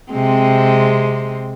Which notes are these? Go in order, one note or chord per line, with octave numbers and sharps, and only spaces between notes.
C3 G#3 C4